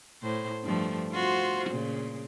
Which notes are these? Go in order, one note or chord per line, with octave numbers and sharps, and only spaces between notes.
A2 C5
G2 F3 A3
F4 F#4 C5
A#2 C#3